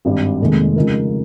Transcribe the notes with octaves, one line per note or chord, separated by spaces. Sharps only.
G#1 G2 G3
F1 D#2 D#3 G#3
C#3 F3 G#3 D#4 A#4